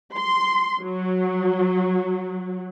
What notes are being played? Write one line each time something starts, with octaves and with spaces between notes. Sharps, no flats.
C6
F#3